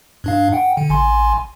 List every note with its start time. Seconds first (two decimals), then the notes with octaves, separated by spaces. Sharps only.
0.24 G2 D4 F5
0.52 F#5 G5
0.77 D3
0.89 A1 G#5 C6